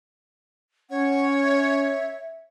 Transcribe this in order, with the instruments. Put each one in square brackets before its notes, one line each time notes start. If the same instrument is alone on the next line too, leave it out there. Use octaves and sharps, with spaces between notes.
[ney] C#4 [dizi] C#5 [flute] F#5
[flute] E5